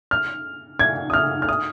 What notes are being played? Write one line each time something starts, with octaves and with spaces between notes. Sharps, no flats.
F6
G#6
D#6
F6
F6
D#6